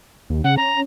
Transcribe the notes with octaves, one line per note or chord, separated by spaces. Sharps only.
D#2
C#3 F#5
C#4 A#5